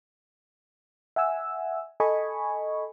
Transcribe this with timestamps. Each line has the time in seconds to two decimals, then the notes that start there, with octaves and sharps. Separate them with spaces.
1.16 E5 F#5 G#5 E6
2.00 A4 D#5 G#5 B5 C#6